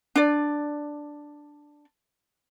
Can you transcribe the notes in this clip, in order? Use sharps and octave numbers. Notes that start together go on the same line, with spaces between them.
D4 D5